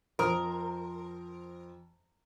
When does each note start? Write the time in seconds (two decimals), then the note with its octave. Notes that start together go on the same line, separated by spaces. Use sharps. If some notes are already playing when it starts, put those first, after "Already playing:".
0.19 F2 A#4 C5 D#6